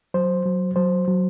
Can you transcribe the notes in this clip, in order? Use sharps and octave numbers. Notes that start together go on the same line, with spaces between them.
F#3 C5
F#3
F#3 C5
F#3